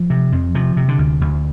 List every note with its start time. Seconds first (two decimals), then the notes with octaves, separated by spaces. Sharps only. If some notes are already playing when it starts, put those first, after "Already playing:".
Already playing: F3
0.10 C3
0.32 F2
0.55 C3 F3
0.77 C3
0.88 D3
0.98 D2
1.21 D2